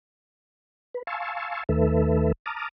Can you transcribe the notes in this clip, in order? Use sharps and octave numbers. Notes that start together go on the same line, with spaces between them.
B4
F5 G#5 A5 C6 C#6 E6
D#2 D#3 A3 A4 B4 E5
A5 A#5 D6 D#6 F6